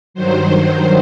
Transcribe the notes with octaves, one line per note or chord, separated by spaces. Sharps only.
G2 D#3 F#3 C5